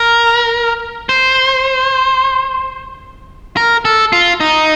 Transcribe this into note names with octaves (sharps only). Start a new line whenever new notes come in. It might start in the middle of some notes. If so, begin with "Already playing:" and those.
Already playing: A#4
C5
A#4
A4
F4
D#4